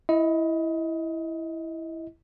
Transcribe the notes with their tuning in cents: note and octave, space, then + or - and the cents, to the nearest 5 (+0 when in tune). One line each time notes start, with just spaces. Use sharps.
E4 +0 D#5 +25